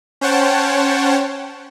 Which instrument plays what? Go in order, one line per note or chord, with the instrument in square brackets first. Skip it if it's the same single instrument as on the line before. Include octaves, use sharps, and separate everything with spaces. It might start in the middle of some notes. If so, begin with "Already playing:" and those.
[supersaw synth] C#4 C5 C#5 F#5 G5 A5